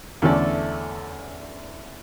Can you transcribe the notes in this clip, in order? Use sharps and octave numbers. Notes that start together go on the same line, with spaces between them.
E2 D3 A3 C#4 A4 D5